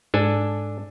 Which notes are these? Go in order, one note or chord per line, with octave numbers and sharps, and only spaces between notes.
G#2 D4 A4 G#5